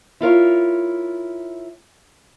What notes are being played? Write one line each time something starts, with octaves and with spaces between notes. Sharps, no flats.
E4 F4 A#4 C#5